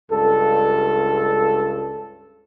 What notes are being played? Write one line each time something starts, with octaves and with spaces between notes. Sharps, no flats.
C#2 G2 A4